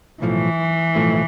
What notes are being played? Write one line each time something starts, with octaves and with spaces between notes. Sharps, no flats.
B1 A2 E3 F3 A3
B1 A2 F3 A3